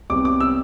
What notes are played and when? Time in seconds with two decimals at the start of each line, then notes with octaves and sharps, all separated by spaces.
0.10 C2 C3 G3 B3 D6
0.25 D6
0.40 E6